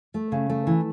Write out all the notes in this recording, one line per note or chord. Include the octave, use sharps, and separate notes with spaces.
A3
C#3
A3
E3